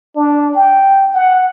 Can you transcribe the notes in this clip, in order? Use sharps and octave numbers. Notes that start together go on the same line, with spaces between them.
D4
G5
F#5